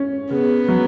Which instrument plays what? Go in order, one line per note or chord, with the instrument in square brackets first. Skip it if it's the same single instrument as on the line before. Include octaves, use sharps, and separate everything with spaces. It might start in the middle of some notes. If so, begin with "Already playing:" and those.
Already playing: [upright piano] C#4
[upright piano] C#3 [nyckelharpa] B3
[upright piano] F#3